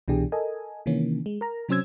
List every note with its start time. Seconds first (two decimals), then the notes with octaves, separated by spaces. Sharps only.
0.08 C2 B2 E3 D4 G4 G#4
0.32 A4 A#4 D#5 G#5
0.86 C3 D#3 E3 A#3 C#4
1.26 G#3
1.41 A#4 A#5
1.69 C3 F#3 C#4 C5 E6 G#6